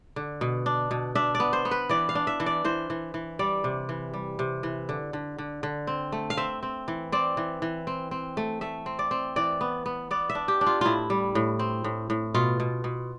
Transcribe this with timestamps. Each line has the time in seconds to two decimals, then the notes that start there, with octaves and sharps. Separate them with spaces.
0.16 D3
0.41 B2
0.66 D4
0.91 B2
1.15 D4 E5
1.35 D5
1.40 B3
1.53 C5
1.65 B3
1.71 B4
1.89 E3 D5
2.09 F5
2.15 D4
2.27 E5
2.40 E3
2.46 D5
2.65 E3 C5
2.90 E3
3.14 E3
3.39 G3 D5
3.64 C3
3.89 E3
4.14 G3
4.39 C3
4.63 E3
4.89 D3
5.13 D3
5.38 D3
5.63 D3
5.87 C4
6.12 A3
6.30 F5
6.37 C4 E5
6.63 C4
6.88 E3
7.12 C4 D5
7.37 E3
7.62 E3
7.87 C4
8.11 C4
8.37 A3
8.61 A3 E5
8.86 C4
8.99 D5
9.11 C4
9.36 E3 D5
9.61 B3
9.86 B3
10.11 B3 D5
10.30 E5
10.35 D4
10.48 G4
10.61 D4
10.66 F4
10.81 A2 E4 F4
11.10 G3
11.35 A2
11.59 C4
11.84 A2
12.10 A2
12.34 B2 F4
12.60 B2
12.84 B2